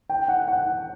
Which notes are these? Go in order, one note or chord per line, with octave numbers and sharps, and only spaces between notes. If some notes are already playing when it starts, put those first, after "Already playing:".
G5
F#5
F#5